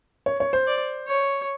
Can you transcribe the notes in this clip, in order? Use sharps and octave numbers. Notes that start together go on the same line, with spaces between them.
C#5
C#5
C5
D5
C#5